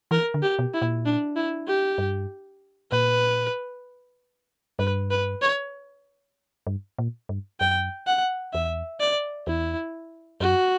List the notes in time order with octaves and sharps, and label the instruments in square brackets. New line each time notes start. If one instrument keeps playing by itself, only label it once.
[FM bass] E3 [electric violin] A#4
[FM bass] D3
[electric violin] G4
[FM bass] B2
[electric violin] E4
[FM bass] A#2
[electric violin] D4
E4
G4
[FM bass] G2
[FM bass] A#2 [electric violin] B4
[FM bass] G2 [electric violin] B4
[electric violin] B4
C#5
[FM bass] G2
A#2
G2
[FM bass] F#2 [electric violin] G5
[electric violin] F#5
[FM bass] E2 [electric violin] E5
[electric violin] D5
[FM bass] E2 [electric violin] E4
[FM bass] F#2 [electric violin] F#4